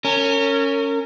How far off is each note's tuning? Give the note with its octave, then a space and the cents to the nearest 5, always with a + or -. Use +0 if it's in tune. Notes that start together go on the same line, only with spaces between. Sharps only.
C#4 +0 A#4 -35